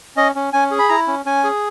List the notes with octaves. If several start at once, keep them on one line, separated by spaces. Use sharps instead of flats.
C#4 D#5
C#4
C#4 G#5
G#4
B5
E4 A#5
C#4
C#4 G#5
G#4